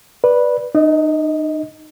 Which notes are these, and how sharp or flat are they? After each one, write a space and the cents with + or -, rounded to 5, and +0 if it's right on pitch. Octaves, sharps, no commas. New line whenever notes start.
B4 -10 D5 +0
D#4 -35 D#5 +20